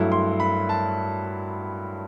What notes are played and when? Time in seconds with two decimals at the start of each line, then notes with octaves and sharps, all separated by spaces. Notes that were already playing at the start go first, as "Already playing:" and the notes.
Already playing: G2 F#3 A3 E4
0.12 C6
0.40 B5
0.69 A5